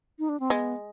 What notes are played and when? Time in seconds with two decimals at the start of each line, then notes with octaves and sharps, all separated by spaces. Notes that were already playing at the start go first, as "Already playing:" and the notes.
0.19 D#4
0.29 D4
0.40 C4
0.50 G#3 B3